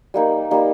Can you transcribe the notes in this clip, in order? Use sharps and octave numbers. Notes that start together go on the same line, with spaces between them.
G3 A#3 D#4
G3 A#3 D#4